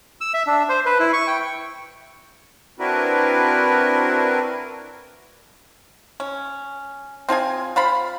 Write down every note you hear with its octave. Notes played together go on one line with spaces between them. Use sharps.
E6
E5
D4
C5
B4
E4
C#6
G5
C4 D4 E4 F#4 A#4 B4
C#4
C4 F4 G#4 G#5
F4 C5 F5 B5